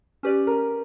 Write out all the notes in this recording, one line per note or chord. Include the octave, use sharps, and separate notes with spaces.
C#4 G4 B4 D5
A#4